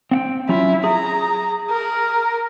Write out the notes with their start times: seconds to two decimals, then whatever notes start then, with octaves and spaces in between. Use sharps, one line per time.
0.11 C4 F#5 G5
0.49 F#3 C#4 E4 F4
0.84 G#4 A#5
1.70 A#4